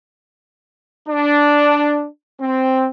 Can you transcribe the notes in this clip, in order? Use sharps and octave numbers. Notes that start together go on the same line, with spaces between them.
D4
C4